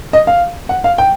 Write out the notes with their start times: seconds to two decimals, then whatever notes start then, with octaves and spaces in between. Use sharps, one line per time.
0.13 D#5
0.27 F5
0.69 F#5
0.84 F5
0.98 G5